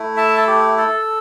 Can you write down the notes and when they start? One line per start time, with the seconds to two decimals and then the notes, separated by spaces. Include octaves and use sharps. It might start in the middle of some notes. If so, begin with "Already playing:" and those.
Already playing: A3 E4
0.17 E5 A5
0.37 A4
0.47 G4
0.78 A4